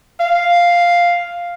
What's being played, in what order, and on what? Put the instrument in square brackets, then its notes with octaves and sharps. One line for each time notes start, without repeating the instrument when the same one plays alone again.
[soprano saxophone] F5